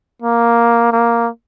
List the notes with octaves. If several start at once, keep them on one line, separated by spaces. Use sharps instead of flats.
A#3
A#3